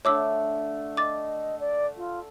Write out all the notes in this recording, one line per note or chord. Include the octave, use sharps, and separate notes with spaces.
D3 A3 C#5 D6 E6
D#5 D6 A6
D5
F4